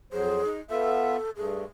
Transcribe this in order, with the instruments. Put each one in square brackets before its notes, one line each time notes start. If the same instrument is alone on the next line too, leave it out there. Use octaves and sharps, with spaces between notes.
[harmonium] F2 F#3 C5 [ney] G#4
[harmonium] D#4
[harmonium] B3 F4 E5 [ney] A4
[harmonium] G2 A3 [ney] G#4